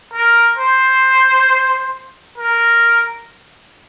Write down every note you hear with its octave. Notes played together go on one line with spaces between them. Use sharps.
A#4
C5
A#4